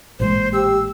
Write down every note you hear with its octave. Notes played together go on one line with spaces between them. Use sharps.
A1 A#2 G#3 C5
G4 E6